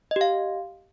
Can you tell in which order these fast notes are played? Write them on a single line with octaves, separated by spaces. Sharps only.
D#5 G4 F5